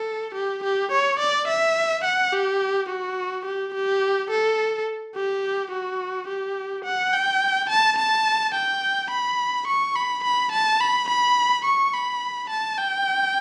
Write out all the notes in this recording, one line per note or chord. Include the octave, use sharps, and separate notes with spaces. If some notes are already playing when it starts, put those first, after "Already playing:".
Already playing: A4
G4
G4
C#5
D5
E5
F#5
G4
F#4
G4
G4
A4
G4
F#4
G4
F#5
G5
A5
A5
G5
B5
C#6
B5
B5
A5
B5
B5
C#6
B5
A5
G5